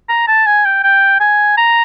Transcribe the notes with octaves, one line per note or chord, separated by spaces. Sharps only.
A#5
A5
G#5
G5
G5
G#5
A#5